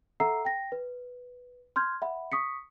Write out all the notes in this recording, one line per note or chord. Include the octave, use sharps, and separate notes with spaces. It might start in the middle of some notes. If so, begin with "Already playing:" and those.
A4 E5 F#5 A#5 E6 C7
G5 A#6
B4
C6 F6 G6 G#6
E5 F#5 B5
C#6 D#6 B6 C#7